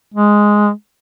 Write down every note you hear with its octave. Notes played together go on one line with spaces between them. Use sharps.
G#3